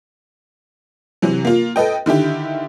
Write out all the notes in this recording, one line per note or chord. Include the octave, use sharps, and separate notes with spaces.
C3 E3 F#3
A#3 F4
A4 B4 D#5 G5
D3 D#3 E4 G4